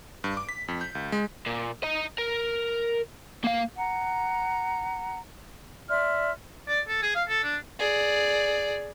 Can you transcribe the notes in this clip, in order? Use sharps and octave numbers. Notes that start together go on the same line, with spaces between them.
G2
D6
B6
F2
G6
C#2
G#3
A#2
D#5 A#5
A#4
A#3 F5
F#5 A#5
D5 E5 C6 F6
D5
A4
G#4
F5
A4
D4
G#4 D5